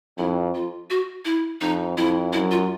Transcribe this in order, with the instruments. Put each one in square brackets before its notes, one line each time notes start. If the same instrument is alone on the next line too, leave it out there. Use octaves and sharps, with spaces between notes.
[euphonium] F2 [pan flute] E4
[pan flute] F4
F#4
E4
[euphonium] F2 [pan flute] D#4
[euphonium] F2 [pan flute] E4
[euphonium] F#2 [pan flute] E4
[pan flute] F4